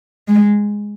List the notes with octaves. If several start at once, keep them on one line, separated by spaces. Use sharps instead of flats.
G#3